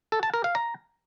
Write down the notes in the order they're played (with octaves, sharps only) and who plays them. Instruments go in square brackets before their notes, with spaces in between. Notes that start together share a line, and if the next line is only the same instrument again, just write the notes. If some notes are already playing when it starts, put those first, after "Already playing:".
[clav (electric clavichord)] A4
A5
A#4
F5
A#5